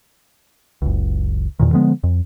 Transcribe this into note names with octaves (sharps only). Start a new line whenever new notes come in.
F#1 C#2
E2 A#2 D#3
D3 F3 G#3 B3
F2